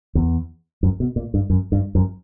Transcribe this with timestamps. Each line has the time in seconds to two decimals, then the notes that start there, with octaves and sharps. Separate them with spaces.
0.15 E2
0.83 F#2
1.00 B2
1.16 A#2
1.34 G2
1.50 F#2
1.72 G2
1.95 F#2